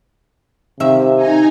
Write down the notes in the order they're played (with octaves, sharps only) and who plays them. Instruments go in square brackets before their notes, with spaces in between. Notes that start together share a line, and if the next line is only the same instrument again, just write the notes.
[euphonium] C3 [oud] D#3 E5
[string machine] D#4 G#5 A#5